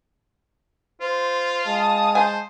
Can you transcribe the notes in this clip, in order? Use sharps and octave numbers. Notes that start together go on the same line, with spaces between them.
F4 C5
G#3 F5 A5 D#6
C5 G#5